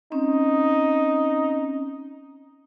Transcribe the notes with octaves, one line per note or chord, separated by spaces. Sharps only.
C4 C#4 D#4